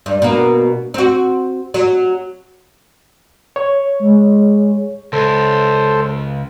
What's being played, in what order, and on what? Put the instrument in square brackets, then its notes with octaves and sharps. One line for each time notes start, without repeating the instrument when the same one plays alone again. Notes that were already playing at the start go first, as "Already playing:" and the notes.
[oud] G2
B2 A#3
C4 F#4
F#3
[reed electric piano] C#5
[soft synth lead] G#3
[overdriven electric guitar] C#2 [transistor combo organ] A4 C5